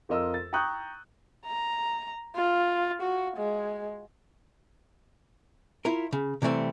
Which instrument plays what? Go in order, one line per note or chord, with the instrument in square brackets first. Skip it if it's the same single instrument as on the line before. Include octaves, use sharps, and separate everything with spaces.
[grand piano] F2 F4 A#4 D#5 E6
A6
G5 A#5 C#6 D#6 F#6 G6
[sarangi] A#5
F4
F#4
G#3
[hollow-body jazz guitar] E4 F4 A#4
C#3
C3 E3 G3 A3 C4